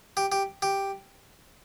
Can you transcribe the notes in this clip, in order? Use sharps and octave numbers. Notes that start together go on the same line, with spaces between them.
G4
G4
G4